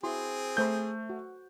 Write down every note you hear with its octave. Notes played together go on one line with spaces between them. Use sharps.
C4 E4 F#4 G#4 C6
A3 A4 C5 B5 G6
F#4